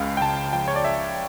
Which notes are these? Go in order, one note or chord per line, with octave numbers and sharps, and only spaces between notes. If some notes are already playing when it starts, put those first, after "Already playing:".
Already playing: C#2 C#3 F5
G5
C#2 A5
F3 G5
C#5
D5
C#3 E5